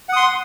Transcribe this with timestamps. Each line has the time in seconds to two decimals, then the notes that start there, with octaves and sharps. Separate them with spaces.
0.09 F#5
0.13 D#6
0.16 C6